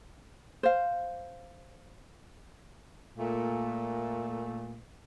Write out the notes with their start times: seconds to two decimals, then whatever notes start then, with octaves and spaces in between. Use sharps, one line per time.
0.63 C5 F5
3.17 A#2 A3